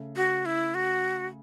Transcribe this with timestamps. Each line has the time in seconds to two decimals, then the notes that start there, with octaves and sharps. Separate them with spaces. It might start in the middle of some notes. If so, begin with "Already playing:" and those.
Already playing: C#3 A3
0.16 F#4
0.46 E4
0.75 F#4